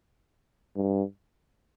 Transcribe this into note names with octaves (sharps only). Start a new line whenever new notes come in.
G2